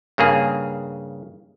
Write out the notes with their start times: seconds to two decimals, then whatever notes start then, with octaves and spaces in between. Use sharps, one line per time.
0.18 G2 C#3 A#3 G#4